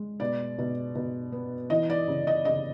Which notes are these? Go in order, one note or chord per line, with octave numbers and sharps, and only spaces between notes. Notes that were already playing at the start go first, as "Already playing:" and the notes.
Already playing: G#3
B2 D5
B2
B2
B3
E3 D#5
D5
C#3
D#5
C#3 D#5